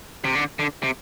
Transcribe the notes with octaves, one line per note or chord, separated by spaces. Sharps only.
C3
D3
D3
C3